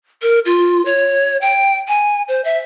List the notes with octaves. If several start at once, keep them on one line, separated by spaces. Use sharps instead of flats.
A#4
F4
C#5
G5
G#5
C5
E5